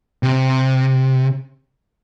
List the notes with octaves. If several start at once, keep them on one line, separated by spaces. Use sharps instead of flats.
C3